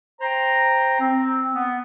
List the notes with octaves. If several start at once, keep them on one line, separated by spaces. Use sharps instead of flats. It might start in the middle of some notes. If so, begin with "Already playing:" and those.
C5 G5 A#5
C4
B3